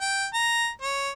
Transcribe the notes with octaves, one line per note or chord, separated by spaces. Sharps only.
G5
A#5
C#5